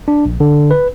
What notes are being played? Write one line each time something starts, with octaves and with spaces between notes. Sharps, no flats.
D4
A#1
D3
B4